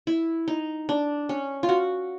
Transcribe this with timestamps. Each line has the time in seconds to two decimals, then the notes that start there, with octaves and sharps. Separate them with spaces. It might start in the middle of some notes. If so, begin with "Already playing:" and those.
0.07 E4
0.48 D#4
0.89 D4
1.29 C#4
1.63 F4
1.69 F#4